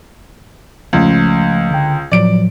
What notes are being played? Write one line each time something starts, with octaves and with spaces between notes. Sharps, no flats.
C#2 F3 A3
D3 G5
A2 F3 F#3 D5 D7